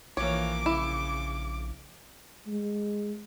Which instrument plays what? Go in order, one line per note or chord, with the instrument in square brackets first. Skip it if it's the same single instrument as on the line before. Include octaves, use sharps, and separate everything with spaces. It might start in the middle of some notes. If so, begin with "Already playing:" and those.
[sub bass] A#1 [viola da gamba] E3 F3 A#3 [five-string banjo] C#5 [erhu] D6
[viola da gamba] C#3 [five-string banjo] E4
[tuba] G#3